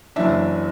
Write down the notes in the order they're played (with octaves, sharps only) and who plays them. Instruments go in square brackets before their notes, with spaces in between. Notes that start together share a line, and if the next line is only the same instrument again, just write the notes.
[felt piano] F#1 F#2 E3 D4 E5